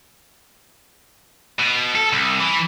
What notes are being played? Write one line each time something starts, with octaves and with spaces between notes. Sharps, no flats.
B2
A4
C2
E3